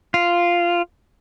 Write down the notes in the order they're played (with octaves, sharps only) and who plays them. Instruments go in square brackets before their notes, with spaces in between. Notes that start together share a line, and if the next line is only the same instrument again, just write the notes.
[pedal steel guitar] F4